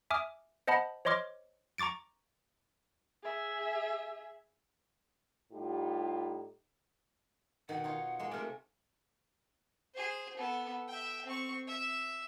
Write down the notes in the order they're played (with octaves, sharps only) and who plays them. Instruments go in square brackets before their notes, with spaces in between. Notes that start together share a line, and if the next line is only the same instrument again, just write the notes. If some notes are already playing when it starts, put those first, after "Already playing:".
[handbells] E5 G#5 D6 D#6 F6
C5 D#5 F#5 A5 B5
C5 C#5 D#5 C6 D6 F6
A#5 C#6 D6 A6 D7
[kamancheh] G#4 E5
[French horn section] A2 G3 D#4 F4 G4
[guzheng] B2 D#3 [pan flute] F#5
[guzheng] D#4 F4 C#5
G#3 A#3 C6
[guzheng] C3 A3 [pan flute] A#4
[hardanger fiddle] G#4 C5
B3 A4
E5 G5
C4 C#6
E5